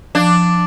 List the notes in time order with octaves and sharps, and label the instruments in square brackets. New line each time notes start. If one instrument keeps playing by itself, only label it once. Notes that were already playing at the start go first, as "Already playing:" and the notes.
[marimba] F3 [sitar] D4